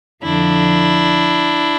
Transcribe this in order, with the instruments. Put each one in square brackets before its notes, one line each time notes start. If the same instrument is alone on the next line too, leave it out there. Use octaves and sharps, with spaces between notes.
[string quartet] F2 D3 F3 D4 E4